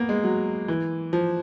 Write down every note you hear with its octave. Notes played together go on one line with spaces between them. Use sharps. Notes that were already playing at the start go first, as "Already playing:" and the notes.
Already playing: A#3 B3
G#3
F#3
E3
F3